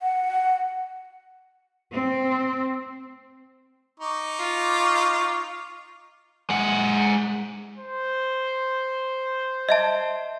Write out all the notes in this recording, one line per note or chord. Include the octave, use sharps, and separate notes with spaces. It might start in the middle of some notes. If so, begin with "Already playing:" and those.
F#5
C4
D#4 C#6 D6
F4
G#3 F#5
C5
D#5 E5 A5